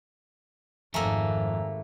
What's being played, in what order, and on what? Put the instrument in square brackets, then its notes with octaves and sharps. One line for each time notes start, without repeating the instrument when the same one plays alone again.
[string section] G#1 [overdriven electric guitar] F2 [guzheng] A3 A#3 [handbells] G#5 A#5 E6